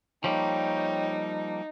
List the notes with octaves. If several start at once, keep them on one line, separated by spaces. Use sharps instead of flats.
F3 G3 A#3 D#4 C#5 G5